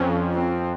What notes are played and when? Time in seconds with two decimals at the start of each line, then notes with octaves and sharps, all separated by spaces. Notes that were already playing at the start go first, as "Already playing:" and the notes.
Already playing: F2 C#4
0.34 C4